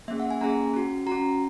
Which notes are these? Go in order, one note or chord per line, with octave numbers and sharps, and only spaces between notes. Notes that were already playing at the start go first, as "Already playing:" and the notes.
A#3 C#4 G#4 E5
F#5
G#5
A#3 C#4 G#4 A#5
C#4 F#4
C#4 F#4 A#5